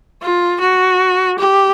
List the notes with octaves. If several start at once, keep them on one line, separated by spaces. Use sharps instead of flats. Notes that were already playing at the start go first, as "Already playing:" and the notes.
F4
F#4
G4